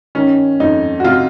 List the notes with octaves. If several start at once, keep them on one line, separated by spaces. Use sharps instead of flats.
D#3 C#4
F2 D#4
F#4
C3 F4